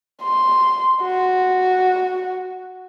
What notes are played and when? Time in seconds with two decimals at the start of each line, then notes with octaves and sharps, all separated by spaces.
0.23 C6
1.03 F#4